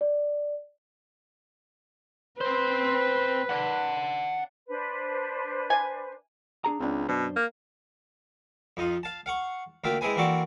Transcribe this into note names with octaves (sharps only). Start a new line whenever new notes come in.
D5
C4 B4 C5
D5 F#5
D4 B4 C5
G#5
D4 G#4 A#5
C#2 C4 D4
F#2 B2 D4 C5
A#3
F2 D#4 F4
F5 A5
F5 F#5 C#6
D2 A#3 F4 E5 F5 G5
G#3 C4 E4 G#4 B4 G#5
E3 A#3 C4 F#4 A4 D5